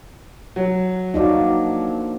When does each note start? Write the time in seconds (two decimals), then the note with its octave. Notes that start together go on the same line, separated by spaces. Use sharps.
0.56 F#3
1.14 A#2 D3 F3 D#4 F#4 D5